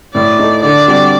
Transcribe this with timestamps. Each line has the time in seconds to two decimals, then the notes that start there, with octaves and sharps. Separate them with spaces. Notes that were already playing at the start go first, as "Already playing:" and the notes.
0.14 A2 D5
0.38 A3 D#4
0.62 D3 D5
0.87 G3 C4 F#4